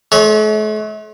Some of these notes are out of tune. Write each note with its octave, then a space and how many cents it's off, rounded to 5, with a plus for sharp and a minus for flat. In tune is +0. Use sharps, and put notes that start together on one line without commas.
A3 -45 C#5 +5